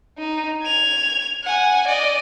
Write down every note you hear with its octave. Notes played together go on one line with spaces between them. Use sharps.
D#4
G#6 F7
F#5 G#5
D5 D#5